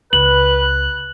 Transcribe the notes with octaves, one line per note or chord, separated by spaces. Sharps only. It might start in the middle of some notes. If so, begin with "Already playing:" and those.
C#2 B4 F#6 F#7